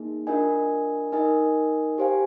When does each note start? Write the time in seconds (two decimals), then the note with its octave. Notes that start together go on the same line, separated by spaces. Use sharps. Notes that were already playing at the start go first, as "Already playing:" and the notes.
Already playing: A#3 D#4 G#4
0.27 D4 F4 A#4 D#5 G#5
1.12 D#4 A#4 D#5 G#5
1.98 G4 C5 F5 G#5